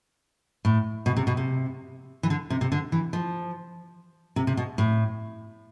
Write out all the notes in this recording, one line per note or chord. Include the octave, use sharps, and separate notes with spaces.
A2
B2
C3
B2
C3
E3
D3
C3
C3
D3
E3
F3
C3
C3
B2
A2